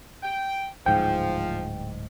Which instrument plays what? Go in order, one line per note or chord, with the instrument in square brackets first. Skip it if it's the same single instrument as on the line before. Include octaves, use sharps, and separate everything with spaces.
[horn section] G5
[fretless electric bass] D1 G#2 [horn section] F3 [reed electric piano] G5